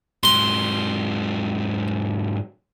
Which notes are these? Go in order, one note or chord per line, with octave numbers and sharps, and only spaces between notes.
G#2 F#3 C6